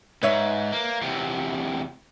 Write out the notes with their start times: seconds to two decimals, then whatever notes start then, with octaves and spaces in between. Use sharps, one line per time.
0.23 G#2 B4 C#5 E5
0.72 A#3
1.01 E2 C3